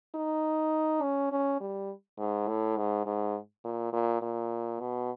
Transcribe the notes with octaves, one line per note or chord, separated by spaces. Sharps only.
D#4
C#4
C#4
G3
G#2
A2
G#2
G#2
A#2
A#2
A#2
B2